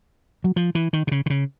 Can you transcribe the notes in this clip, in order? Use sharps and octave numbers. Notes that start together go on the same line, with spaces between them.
F#3
F3
E3
D#3
C3
C#3
D3
C#3